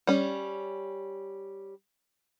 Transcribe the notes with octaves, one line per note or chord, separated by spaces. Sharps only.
G3 C#4